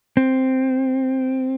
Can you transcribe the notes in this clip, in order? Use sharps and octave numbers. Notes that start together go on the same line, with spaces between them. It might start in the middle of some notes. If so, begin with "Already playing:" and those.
C4